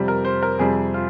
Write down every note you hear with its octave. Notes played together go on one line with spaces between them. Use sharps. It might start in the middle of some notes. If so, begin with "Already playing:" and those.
Already playing: F2 C3 G3
A#4
C5
A#4
F2 C3 G3 G#4
F4